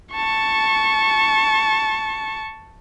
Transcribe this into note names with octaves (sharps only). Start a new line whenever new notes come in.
A5 C#6